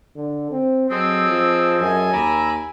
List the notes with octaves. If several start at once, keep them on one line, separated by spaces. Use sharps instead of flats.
D3
C4
F#3 C4 G#4 A4 D#5
F3
F#2 G#5
D#2 A#5 B5 D6 E6